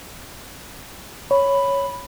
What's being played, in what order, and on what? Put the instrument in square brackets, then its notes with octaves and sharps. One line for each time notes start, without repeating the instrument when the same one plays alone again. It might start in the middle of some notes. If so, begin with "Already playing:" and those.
[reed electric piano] C#5 [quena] B5